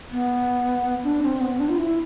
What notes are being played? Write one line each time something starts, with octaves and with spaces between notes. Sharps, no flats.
B3
D4
C4
B3
D4
F4
E4